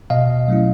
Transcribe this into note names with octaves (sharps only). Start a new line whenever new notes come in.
B2 D#5 F5
F#3 A3 C#4 E4